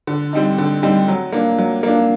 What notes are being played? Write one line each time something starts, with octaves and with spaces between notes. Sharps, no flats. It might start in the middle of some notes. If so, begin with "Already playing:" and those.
D3
G3 C4 D#4
D3
G3 C4 D#4
F#3
A#3 D4
F#3
A#3 D4